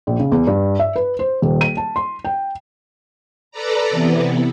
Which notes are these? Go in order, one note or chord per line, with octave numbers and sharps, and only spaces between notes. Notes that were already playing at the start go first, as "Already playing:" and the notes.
A#1
C#3
E2
G2
E5
B4
C5
D#1
D#7
A5
C6
G5
A4 B4 D5 A#5
C3 E3 B3